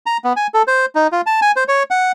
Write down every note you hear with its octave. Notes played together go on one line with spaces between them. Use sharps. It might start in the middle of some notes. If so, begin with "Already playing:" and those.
A#5
B3
G#5
A4
C5
D#4
F4
A5
G#5
C5
C#5
F#5